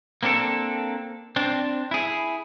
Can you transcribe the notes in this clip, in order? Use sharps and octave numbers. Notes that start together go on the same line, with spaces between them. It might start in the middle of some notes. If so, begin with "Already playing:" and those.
A#3 C4 D4 F4 A4
C4 D4
E4 G#4